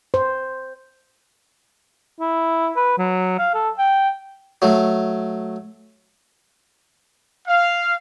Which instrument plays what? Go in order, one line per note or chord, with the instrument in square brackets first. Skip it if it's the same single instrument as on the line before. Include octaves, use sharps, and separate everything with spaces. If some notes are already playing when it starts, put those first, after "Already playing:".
[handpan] C5
[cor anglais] E4
B4
F#3
F5
A4
G5
[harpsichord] F#3 A3
[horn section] F5